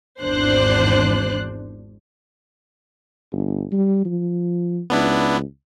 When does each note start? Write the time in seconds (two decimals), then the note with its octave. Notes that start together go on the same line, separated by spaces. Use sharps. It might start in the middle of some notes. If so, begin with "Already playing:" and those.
0.21 G#1 E2 D4 C5 F#6
3.32 G1
3.72 G3
4.05 F3
4.90 C#2 B3 D4 E4